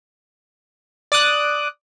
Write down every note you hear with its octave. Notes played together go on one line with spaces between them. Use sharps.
D5 D6 D#6 F#6